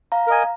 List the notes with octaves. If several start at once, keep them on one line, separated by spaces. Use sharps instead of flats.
F5 A#5
A#4 D#5 G#5